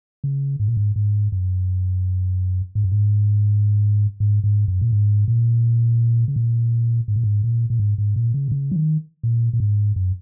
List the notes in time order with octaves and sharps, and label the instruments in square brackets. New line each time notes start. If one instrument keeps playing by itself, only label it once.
[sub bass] C#3
G#2
A#2
G#2
G#2
F#2
G#2
F#2
G#2
G#2
G#2
F#2
A#2
G#2
A#2
C#3
A#2
G#2
A#2
G#2
A#2
A#2
G#2
G#2
A#2
C#3
A#2
C#3
F#3
D#3
A#2
A#2
G#2
F#2